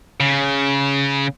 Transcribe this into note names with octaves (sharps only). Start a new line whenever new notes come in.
C#3